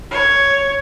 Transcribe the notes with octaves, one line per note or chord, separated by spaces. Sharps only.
C#5